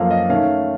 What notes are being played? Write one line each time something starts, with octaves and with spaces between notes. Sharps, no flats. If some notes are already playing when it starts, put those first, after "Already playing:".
Already playing: F#2 F3 A#3 A4 F5
D#5
D#3 A3 C#4 F5